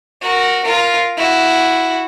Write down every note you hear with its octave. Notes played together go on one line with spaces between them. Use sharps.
F#4 A#4
F4 A#4
E4 F#4